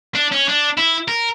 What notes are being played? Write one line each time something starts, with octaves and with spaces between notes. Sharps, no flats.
D4
C#4
D4
E4
A#4